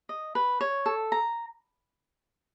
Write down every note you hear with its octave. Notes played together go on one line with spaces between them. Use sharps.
D#5
B4
C#5
A4
A#5